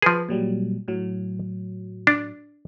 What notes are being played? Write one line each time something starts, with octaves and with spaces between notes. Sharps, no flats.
F3 G#4 B4
A#2 F#3 G3
A2 F#3
D4